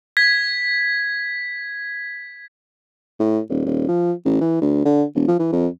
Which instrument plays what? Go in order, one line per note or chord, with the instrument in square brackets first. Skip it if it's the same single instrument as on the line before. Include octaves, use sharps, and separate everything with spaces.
[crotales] G#6 B6
[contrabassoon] A2
D#1
D#1
F3
A1
E3
D2
D3
E1
F3
E3
F2